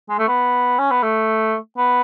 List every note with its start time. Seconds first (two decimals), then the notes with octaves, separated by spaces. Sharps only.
0.09 G#3
0.18 A3
0.28 B3
0.79 C#4
0.90 B3
1.03 A3
1.78 B3